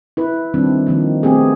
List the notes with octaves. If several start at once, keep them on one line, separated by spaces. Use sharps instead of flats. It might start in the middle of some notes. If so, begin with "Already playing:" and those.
E4 B4
D#3 G3 C4 D4
D#3 F3 A#3
A3 B3 C4 G4 G#4